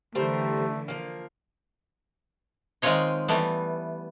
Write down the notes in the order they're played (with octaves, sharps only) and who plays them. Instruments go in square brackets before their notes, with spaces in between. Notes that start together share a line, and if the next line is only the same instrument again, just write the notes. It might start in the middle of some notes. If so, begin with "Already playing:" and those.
[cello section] D3 E3 [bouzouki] G3 A#4 C5 [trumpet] A3
[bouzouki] F3 A#3
[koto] D#3 G#3 C4 F4 C#5 D#5
E3 G3 A3 B3